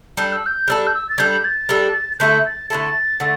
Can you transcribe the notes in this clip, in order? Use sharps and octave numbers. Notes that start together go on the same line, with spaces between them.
G3 D4 A4 G6
E6
G6
G3 D4 A4 E6
G6
E6
A6
G3 D4 A4 G6
A6
G3 D4 A4
D3 A3 E4 A4 G6
A6
D3 A3 E4 A4 A6
D3 A3